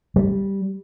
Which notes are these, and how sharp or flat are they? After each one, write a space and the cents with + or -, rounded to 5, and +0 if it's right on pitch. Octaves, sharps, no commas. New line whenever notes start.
G3 -5